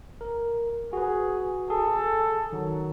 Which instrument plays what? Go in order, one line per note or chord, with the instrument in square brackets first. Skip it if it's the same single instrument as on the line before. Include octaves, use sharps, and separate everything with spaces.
[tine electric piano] A#4
[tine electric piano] F#4 B4 [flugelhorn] G#4
[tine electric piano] G#4 [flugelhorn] A4
[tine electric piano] D#3 [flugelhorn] F#3